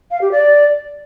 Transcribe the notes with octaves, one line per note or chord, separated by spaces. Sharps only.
F5
G4
D5